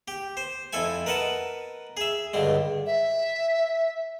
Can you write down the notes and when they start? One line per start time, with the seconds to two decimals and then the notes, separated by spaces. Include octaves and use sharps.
0.08 G4
0.37 C5
0.73 F2 E4 A4 E5 G#5
1.06 A#4 B4 D#5 F#5 A5
1.97 G#4 E5
2.33 C#2 G2 D3 G#3
2.86 E5